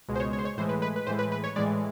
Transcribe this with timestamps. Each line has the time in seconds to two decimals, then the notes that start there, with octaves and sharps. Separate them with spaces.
0.08 C#2 B2 G#3
0.16 C5
0.20 C#5
0.33 C#5
0.39 C5
0.45 C#5
0.57 A2 E3 G#3 C5
0.69 B4
0.82 B4
0.96 B4
1.07 A2 E3 G#3 C5
1.19 B4
1.32 B4
1.44 C#5
1.56 A2 E3 G#3 D5